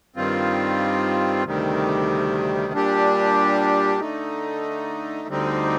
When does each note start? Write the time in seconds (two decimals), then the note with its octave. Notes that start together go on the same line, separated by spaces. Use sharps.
0.16 G2 D#3 G3 C4 F4
1.44 D2 C3 D#3 G3
2.73 A#2 G3 D4 G4
4.00 D3 A3 D#4
5.28 D2 D3 G3 C4 D#4